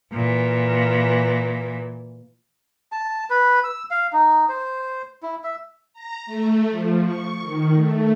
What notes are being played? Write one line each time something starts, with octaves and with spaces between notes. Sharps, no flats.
A#2 E3
A5
B4
E6
F5
D#4
C5
E4
E5
A#5
A3
F3
C#6
D#3
A3